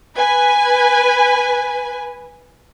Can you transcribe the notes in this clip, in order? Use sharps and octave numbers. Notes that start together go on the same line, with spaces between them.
B4 G#5